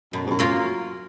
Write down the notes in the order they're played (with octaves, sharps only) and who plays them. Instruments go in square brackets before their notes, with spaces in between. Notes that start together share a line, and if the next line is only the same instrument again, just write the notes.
[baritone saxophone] F#2 [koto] B2
[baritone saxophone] G#2
F#2
[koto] F#3 A#3 F4 A#4